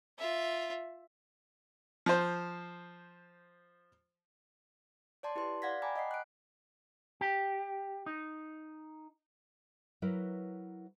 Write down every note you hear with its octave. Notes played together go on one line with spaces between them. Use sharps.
F4 E5
F3 C5
C#5 D5 A5 C6
E4 G4 B4 C6
D5 F5 F#5 G#6 A#6 B6
G5 G#5 A#5 B5 D6
D#5 F#5 B6 C7
F#6 D7
G4
D#4
F#3 E4 A#4 B4